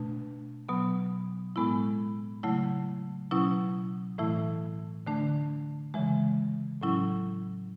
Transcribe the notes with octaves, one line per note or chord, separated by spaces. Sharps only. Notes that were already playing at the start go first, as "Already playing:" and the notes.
Already playing: B2 A3 D4
B2 F#3 B3
A2 G#3 B3 E4
C#3 F#3 A3 E4
B2 F#3 C#4 E4
A2 E3 A3 E4
D3 A3 D4
C#3 E3 G#3
A2 F#3 C#4 E4